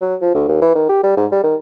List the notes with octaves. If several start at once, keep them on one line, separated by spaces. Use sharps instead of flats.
F#3
F3
D2
D#2
E3
D#3
G4
G3
G#2
G3
D#3